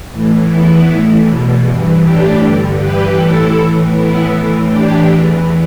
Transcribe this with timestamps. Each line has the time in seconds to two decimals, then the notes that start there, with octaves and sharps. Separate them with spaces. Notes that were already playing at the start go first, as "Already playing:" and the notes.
0.11 A2 E3
0.48 E2 E3 B3 E4
0.86 A2 E3
1.24 E2 B2
1.63 G2 E3
2.01 A2 E3 D4 G4
2.39 G2 D3
2.77 G2 E3 G4 B4
3.15 A2 E3 E4 A4
3.54 A2 E3
3.92 A2 E3 B3 E4
4.30 A2 E3
4.68 A2 E3 D4 G4
5.07 E2 E3